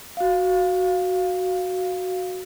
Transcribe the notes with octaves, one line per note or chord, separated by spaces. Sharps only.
F#4 F5